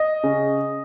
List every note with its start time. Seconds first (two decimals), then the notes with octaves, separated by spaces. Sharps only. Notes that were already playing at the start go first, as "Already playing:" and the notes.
Already playing: D#5
0.24 C#3